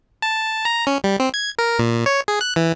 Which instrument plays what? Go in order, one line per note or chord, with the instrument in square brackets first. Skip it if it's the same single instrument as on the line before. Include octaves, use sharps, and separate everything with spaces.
[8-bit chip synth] A5
A#5
C#4
G3
C4
G#6
A#4
A#2
C#5
G#4
F#6
E3